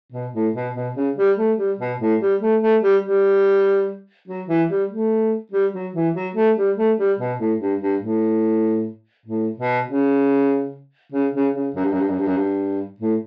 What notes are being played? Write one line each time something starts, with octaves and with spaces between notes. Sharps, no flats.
B2
A2
B2
B2
C#3
G3
A3
G3
B2
A2
G3
A3
A3
G3
G3
F#3
E3
G3
A3
G3
F#3
E3
F#3
A3
G3
A3
G3
B2
A2
G2
G2
A2
A2
B2
C#3
C#3
C#3
C#3
F#2
G2
F#2
G2
F#2
G2
F#2
G2
A2